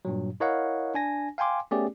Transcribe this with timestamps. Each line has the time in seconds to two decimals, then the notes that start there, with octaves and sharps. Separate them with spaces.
0.05 G2 A#2 F#3
0.40 E4 A#4 C#5 D#5 F5 F#5
0.94 D4 G#5 A#6
1.38 F5 G5 G#5 C6 D6
1.71 A3 B3 C#4 G4 G#4 D5